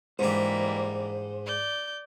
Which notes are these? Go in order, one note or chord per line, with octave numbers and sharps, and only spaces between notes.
G#2 E3 G3 A#3 D4 C5
D5 G6